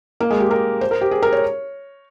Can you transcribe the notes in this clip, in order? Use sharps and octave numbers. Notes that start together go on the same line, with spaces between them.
A#3
G#3
G4
A#4
C5
A#4
G4
G#4
A#4
C#5